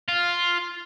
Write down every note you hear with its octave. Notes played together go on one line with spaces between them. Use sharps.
F4